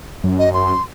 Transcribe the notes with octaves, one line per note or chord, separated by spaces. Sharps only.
F#2
D#5
C6